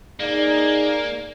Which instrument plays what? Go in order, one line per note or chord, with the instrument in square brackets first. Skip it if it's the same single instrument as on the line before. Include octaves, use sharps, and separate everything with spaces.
[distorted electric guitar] A#3 [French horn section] D#4 G#4 D5